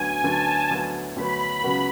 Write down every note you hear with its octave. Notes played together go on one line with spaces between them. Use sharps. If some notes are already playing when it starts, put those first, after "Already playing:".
Already playing: D2 D3 F#3 B3 G#5
D2 D3 F#3 B3 A5
D2 D3 F#3 B3
D2 D3 F#3 B3 B5
C#2 C#3 F#3 B3 F#4